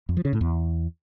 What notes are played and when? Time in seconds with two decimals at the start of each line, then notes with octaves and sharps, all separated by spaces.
0.09 F2
0.17 F3
0.25 C#3
0.33 A2
0.41 E2